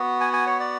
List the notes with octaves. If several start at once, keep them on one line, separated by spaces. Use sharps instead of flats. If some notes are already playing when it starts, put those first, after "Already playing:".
Already playing: B3 F#4
G#5
G#5
C#5
D5